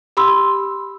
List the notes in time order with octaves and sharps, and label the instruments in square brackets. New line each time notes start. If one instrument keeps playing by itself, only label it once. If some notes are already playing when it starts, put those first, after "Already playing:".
[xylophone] G4 B5 C6 E6